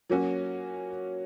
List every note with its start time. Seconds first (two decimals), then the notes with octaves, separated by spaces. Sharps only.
0.10 F#3 A#3 C#4 F#4